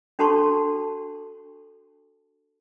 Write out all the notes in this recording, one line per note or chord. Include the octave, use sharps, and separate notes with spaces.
D4 F#4 A4 A5 C6 C#6